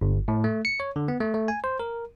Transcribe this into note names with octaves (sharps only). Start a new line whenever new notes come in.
G1
A2
A3
C#7
C#5
D3
B3
A3
A3
G#5
C5
A#4